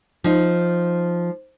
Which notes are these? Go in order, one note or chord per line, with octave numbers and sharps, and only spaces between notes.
F3 D#4